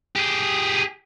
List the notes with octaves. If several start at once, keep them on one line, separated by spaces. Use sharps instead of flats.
G4 G#4